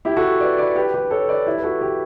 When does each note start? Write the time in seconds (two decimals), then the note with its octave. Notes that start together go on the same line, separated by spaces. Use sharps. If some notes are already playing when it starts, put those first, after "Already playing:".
0.05 E4 G4
0.16 F#4 A4
0.40 B4 D5
0.58 B4 D5
0.76 G4 B4
0.94 G4 B4
1.11 A4 C#5
1.28 B4 D5
1.46 E4 G4
1.58 B4
1.64 F#4 A4
1.81 G4 B4